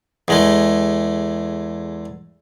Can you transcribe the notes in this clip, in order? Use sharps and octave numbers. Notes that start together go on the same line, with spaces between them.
E2 G#3 A3